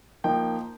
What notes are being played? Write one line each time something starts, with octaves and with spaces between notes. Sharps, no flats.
F3 A#3 D#4 G5